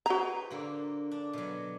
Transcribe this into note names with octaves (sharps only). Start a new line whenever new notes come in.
F#4 G#4 B4 C5 A#5
D3 A#3
D4
B2 F#3